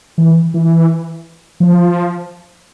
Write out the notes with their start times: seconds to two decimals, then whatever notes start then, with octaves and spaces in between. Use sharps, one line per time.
0.18 E3
0.54 E3
1.60 F3